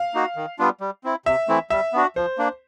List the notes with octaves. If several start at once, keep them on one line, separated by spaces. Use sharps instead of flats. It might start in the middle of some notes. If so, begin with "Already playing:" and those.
Already playing: F5
A#3 D#4 F#4
D#3
G3 B3 D4 F4
G3
C4 E4
C3 E5
E3 A3 C4 E4
G3 E5
B3 D4 F#4
F3 C5
A#3 D4